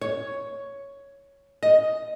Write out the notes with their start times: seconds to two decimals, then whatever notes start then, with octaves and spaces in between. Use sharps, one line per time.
0.01 C#5
1.63 D#5